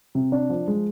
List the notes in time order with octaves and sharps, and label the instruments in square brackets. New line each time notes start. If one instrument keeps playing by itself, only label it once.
[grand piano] C3
D4
F3
G#3